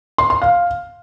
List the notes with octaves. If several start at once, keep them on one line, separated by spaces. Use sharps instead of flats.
C6
C6
F5